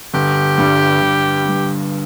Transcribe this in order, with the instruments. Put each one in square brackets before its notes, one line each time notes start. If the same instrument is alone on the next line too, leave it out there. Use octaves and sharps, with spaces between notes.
[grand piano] G1 [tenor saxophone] G4
[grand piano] G2 G3
G1
G2 G3